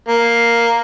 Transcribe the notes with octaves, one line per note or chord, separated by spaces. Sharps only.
A#3